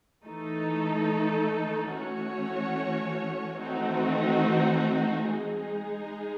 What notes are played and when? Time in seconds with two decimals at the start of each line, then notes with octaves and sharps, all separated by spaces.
0.24 E3 A3 D#4 A4
1.92 E3 A3 C#4 F#4 C#5
3.60 E3 A3 C4 D#4 F#4
5.29 G#3 D#4 G#4